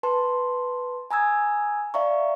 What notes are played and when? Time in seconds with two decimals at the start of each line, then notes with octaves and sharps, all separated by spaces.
0.03 B4 A5 C6
1.11 G#5 A#5 D#6 E6 G#6
1.94 D5 E5 F5 A#5 C#6